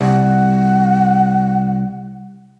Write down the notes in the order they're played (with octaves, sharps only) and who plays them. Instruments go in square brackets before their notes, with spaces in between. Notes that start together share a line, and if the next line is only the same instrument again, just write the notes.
[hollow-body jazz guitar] C2 [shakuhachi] F#5